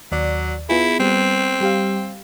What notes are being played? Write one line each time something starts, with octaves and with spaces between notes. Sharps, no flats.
D#2 F#3 D5
B3 E4 F4 G#4
G3 B3 C4
G3 G4 F5